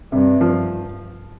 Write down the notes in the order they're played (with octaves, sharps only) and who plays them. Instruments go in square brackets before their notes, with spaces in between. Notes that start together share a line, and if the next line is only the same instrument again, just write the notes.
[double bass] G2 [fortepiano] C3
[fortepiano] F3